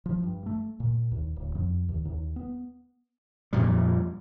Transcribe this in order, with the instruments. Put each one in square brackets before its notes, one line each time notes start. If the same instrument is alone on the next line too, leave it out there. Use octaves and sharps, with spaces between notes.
[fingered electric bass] F3
G2
A3
A#2
D#2
D1
F2
D#2
D#2
B3
[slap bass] F2 A#2 G3